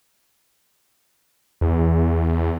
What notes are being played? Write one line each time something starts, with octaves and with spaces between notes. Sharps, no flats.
E2